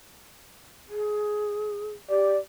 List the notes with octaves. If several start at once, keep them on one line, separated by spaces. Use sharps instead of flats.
G#4
G4 D5